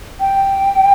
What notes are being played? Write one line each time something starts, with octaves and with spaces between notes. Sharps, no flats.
G5